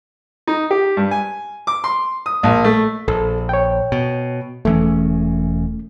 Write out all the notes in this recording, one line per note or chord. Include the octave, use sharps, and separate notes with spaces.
D#4
G4
G2
G#5
D6
C6
D#6
A#1
A3
A#1 A4
C#5 G5
B2
E1 E3 A3 C#4